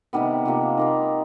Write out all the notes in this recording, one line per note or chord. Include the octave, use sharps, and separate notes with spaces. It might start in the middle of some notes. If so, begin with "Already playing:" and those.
C3 D#3 G3 B3
C3 F3 A#3
G3 A#3 D#4